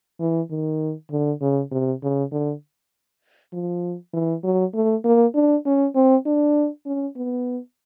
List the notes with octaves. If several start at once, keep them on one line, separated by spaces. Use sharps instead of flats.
E3
D#3
D3
C#3
C3
C#3
D3
F3
E3
F#3
A3
A#3
D4
C#4
C4
D4
C#4
B3